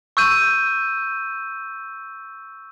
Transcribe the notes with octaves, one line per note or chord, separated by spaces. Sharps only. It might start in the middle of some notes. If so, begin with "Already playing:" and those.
C#6 E6 G6 D#7